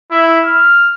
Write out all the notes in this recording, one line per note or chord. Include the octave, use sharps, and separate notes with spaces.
E4
F6